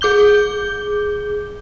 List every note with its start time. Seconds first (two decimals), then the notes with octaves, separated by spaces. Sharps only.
0.01 G#4 D6 G6 G7